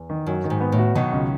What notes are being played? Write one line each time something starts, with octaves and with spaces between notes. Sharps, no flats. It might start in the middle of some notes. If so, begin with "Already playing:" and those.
Already playing: E2
D#3
F#2 F#3
D#3
G#2
B3
A2
F#4
B2 D#3 F#3
C#2